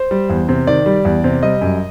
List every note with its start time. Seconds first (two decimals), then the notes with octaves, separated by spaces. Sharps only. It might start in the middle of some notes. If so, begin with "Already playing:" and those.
Already playing: C5
0.11 G3
0.30 E2
0.49 C3
0.67 D#3 D5
0.86 G3
1.05 E2
1.24 C3
1.43 G3 D#5
1.61 F#2